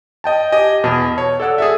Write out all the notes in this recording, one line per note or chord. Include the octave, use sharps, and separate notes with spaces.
D#5 G5 A5
G4 D#5 G#5
E2 B2 A5
C#5
A4 D5 F#5 E6
G#4 A4 E5